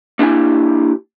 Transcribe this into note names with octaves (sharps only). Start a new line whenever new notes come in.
A#3 D4 E4 G4 G5 G#5